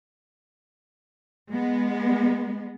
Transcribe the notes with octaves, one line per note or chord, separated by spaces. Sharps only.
G#3 B3